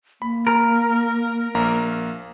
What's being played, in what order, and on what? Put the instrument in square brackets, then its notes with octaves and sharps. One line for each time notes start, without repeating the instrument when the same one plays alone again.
[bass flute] A#3 [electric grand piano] B5
[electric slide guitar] A#4
[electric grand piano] A#1 A#3 A#5